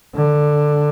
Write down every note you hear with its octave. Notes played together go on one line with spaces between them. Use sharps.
D3